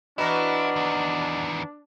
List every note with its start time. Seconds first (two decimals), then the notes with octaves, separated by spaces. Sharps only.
0.18 E3 B3 D4 E4 F#4 D#5 A#5 F6
0.76 E2 D#3